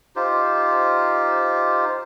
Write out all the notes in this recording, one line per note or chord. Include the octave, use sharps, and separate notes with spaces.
D#4 F4 G4 C5